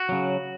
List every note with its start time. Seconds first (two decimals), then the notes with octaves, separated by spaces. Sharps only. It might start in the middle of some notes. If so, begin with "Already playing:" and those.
Already playing: F#4
0.09 C#3 F#3